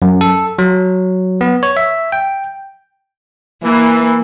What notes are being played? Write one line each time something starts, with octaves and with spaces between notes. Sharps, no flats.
F#2
A4
F#3
B3
C#5
E5
G5
E3 A#3